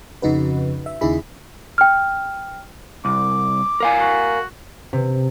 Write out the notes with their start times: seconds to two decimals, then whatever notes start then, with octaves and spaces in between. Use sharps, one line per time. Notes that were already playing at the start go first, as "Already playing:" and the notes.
0.22 F2 C#3 D#4 F#4 B4
0.86 E5
1.01 D#2 C#3 D#4 E4 G#4 B5
1.78 G5 F6
3.05 C2 D6
3.80 A#4 F5 G#5
4.00 F#4
4.93 C3